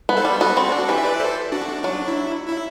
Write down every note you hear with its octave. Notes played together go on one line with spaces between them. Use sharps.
B3
A4 C5
G3
B3 F#4 A4
C4
D4
E3 G4 B4
E5
B4 D5
A4 C5
D4 F#4
D4
F#3 D4
E4
E4